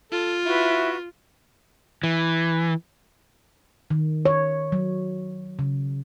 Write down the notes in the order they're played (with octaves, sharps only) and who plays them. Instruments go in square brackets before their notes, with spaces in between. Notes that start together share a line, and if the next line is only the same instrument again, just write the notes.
[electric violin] F4 [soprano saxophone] A4
[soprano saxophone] E4 [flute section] F#4 B4 E5
[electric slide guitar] E3
[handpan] D#3
C#5
F#3
C#3